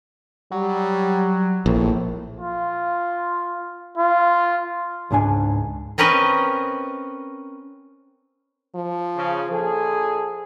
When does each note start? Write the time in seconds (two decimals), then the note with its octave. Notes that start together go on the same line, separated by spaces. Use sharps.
0.51 F#3 G3
1.66 A#1 A2
2.40 F4
3.98 F4
5.11 C#2 G#2 D4 G#5
5.98 C4 C#4 A#4 B4 D#5
8.75 F3
9.16 C#3
9.52 A#1 G#4 A4